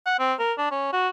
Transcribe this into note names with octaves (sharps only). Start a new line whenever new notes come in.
F#5
C4
A#4
D4
C#4
F#4